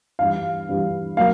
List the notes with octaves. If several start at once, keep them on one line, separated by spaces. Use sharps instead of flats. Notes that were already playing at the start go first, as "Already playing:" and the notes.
G2 E3 G3 F5
G2 E3 G3
F#3 A#3 F5